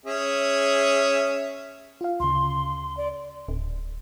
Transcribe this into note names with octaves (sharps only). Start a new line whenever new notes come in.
C#4 G#4 E5
F4 F5
D2 C#3 C6
D5
D1